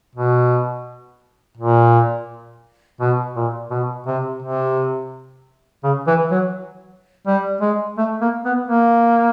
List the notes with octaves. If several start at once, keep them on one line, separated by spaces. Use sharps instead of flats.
B2
A#2
B2
A#2
B2
C3
C3
C#3
E3
F#3
G3
G#3
A3
A#3
B3
A#3